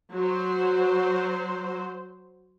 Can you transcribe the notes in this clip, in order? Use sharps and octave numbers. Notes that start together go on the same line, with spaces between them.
F#3 C5